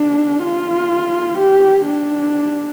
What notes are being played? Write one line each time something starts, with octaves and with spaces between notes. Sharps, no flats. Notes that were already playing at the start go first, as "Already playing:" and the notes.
Already playing: D4
F4
G4
D4